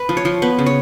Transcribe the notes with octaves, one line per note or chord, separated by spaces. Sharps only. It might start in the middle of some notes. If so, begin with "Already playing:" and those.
Already playing: B4
F3
C#5
F3
B3 B4
C#3
C#5